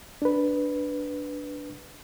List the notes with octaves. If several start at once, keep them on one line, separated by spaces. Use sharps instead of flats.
D4 B4